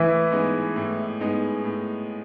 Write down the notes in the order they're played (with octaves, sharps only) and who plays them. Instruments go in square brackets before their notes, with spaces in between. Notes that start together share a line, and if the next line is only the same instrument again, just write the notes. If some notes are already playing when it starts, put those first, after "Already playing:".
Already playing: [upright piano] A2 [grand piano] E3 E4
[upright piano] G#3 B3 D#4
A2
G#3 B3 D#4
A2